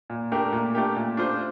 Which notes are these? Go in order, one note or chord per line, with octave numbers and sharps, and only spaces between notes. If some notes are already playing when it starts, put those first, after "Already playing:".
A#2
A3 D4 G4 A#4
A#2
A3 D4 G4 A#4
A#2
A3 D4 F4 C5